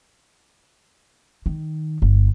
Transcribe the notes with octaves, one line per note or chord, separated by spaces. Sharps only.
D#3
G1